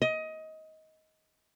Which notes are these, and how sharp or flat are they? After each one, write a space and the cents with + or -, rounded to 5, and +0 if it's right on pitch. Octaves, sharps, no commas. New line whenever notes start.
D#5 +20